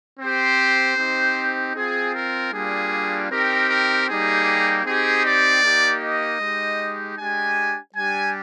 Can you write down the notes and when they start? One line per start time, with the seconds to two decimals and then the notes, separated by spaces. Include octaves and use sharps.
0.19 C4 G4 C5
0.97 C4 D#4 G4
1.75 C4 F4 G#4
2.14 A#4
2.52 G3 A#3 D4 F4 G#4
3.30 C4 D#4 G4 A#4
3.68 A#4
4.08 G3 A#3 D#4 G4 G#4
4.85 C4 D#4 G4 G#4
5.24 D5
5.63 A#3 D#4 G4
6.01 D#5
6.40 G#3 D#4 G4
7.18 G#3 D4 G4 G#5
7.95 G3 D4 G4 G#5